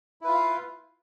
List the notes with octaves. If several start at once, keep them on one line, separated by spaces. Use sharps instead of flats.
E4 F4 B4 F5